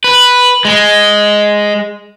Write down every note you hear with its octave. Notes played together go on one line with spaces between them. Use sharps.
B4
G#3